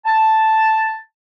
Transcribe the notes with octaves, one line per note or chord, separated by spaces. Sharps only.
A5